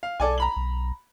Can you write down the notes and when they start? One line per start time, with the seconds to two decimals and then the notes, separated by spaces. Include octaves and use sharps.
0.03 F5
0.20 B1 A4 D5 G#5
0.38 A#5 B5 F#7
0.56 B1